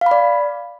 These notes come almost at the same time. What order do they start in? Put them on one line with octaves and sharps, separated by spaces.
F5 B5 D5